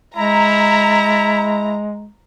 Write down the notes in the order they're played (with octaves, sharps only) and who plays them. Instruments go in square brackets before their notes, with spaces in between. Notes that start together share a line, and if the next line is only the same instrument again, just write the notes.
[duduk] G#3 [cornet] E4 [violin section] A#5